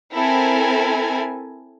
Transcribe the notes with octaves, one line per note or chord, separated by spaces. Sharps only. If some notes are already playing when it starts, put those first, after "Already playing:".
C4 E4 A4 A#4 G#5